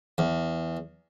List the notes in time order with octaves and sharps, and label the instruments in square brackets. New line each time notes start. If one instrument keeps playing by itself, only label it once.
[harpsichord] E2